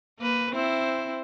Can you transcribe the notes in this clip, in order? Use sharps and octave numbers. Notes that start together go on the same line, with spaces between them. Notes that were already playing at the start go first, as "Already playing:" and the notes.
A#3 B4
C4 E4 C5